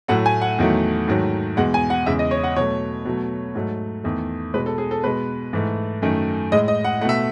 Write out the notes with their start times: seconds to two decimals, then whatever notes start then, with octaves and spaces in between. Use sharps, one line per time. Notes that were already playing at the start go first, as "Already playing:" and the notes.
0.08 A2 F#3 A3 F#5
0.26 G#5
0.42 F#5
0.58 E2 D#3 F#3 A3
1.08 G#2 D#3 F#3 A3
1.57 E2 B2 G#3 F#5
1.74 G#5
1.90 F#5
2.06 E2 C#3 G#3 E5
2.19 D#5
2.31 C#5
2.44 F#5
2.56 B2 F#3 A3 C#5
3.05 B2 F#3 A3
3.55 G#2 F#3 A3
4.04 E2 D#3 A3
4.54 B2 G#3 B4
4.66 A4
4.78 G#4
4.91 A4
5.03 B2 G#3 B4
5.53 G#2 E3 A3
6.02 F#2 D#3 A3
6.52 A2 G#3 D#5
6.68 D#5
6.85 F#5
7.01 A3 F#5
7.05 B2 E5